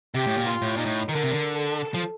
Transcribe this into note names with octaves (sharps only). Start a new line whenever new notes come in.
C3 G4
A2
A#2
F4
A2
A#2 D#4
A2
D#3 A#4
D3
C3
D3
A4
F3